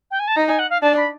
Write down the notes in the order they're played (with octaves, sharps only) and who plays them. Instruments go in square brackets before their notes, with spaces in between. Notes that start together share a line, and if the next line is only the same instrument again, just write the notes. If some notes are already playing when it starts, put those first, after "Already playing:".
[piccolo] G5
G#5
A5
[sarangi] D#4 [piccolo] A#5
[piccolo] G#5
F#5
F5
[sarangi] D4 [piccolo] A5
[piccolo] B5